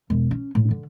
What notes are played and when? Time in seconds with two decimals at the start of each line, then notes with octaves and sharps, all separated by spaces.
0.10 E1
0.31 C#4
0.55 A2
0.71 D3